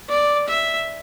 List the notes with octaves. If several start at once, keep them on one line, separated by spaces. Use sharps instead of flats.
D5
E5